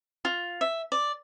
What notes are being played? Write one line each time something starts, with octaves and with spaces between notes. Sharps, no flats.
F4
E5
D5